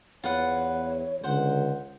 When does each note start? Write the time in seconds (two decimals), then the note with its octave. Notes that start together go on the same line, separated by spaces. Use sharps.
0.24 E2 F4 B4 C#5 F#5
1.24 C#2 D3 C5 F#5